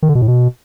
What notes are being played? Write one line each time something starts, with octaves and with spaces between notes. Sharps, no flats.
D#3
D3
B2
A2
B2